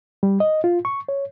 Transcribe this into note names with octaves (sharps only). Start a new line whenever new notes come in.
G3
D#5
F4
C#6
C#5